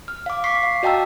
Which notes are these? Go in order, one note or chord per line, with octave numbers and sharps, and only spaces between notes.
F6
F5 D6
C#6 D6 B6 C7
F5
F#4 D#5 G5 A5 A#5 E6